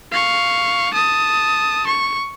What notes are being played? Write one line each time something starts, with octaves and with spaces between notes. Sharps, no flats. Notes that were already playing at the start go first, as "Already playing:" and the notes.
F5 C#6
A5 D#6
C#6